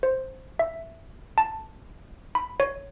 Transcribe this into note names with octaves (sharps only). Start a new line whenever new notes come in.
C5
E5
A5
B5
C#5